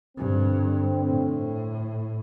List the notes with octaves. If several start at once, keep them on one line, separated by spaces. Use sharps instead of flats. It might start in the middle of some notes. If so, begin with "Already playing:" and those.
G2 D3 G3 C4
A2